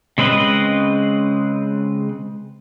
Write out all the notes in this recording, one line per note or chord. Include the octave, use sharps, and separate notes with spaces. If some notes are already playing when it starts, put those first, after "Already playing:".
C#3 G#3 C4 B4 D#5